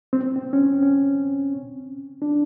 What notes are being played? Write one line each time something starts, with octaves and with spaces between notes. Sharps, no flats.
C4
C4
C#4
C4
C#4
D4